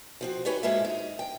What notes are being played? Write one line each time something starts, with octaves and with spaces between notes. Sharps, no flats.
F3 C4 F#4
D#4 F#4 G4 B4 C#5 G#5
G#2 G#3 A#3 F4 A4 E5
D#4
G5